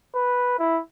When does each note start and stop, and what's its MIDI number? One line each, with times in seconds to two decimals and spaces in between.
0.14 0.55 71
0.59 0.80 64